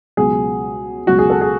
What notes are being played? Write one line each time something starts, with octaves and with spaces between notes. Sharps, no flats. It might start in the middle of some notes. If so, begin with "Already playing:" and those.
C#2 B2 F#3 G#4
C#2 B2 F#3 F#4
G#4
A4
G#4